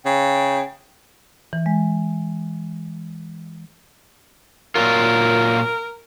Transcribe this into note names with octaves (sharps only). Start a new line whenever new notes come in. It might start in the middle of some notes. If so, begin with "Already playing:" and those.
C#3 G5
E3
G#3
A#2 F#3 F4 A#4